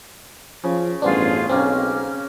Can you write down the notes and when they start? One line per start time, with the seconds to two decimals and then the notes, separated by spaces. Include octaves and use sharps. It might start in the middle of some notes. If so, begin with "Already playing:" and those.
0.64 C#3 F3
1.02 A1 G2 B3 D4 F4 G#4 C5
1.49 B1 C#3 A#3 C4 C#4 F6